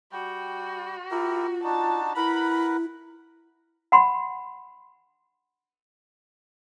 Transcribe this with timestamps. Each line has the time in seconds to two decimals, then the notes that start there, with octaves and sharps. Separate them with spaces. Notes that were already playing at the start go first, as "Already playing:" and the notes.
0.12 G3 F#4 G5
1.11 E4 F4 G4 A#4
1.64 D4 D#4 F#4 A5
2.16 E4 A#4 B4 F#5 B5
3.92 F#5 B5 C6